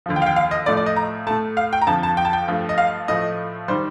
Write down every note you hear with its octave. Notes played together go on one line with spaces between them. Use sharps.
D#2 D3 F3
G5
F5
G5
F5
D#5
A2 F3 A3 D5
D5
D#5
A#5
A2 A3 A5
F5
G5
A#5
F2 D3 F3 A5
A5
G5
A5
G5
G2 F3 A3
D#5
F5
A2 F3 A3 D#5
D#3 G3 C5